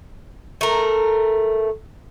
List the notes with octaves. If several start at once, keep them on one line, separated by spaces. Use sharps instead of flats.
A3 A#4